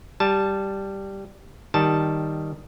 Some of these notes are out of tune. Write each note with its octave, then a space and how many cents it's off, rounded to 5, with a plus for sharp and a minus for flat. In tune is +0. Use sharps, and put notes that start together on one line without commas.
G3 +0 A5 +0
D#3 +0 G3 +0 A5 +0